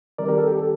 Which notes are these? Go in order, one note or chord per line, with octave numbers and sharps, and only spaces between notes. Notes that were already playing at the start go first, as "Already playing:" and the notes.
D#3 G3 C4 A#4 D5
G4 A#4
A4
G4
A4